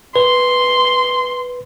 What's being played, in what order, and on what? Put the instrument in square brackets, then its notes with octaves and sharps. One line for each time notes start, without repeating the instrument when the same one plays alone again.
[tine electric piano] B4 [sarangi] C6